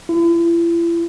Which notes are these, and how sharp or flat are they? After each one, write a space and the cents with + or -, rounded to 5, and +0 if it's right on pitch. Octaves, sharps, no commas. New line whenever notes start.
E4 +40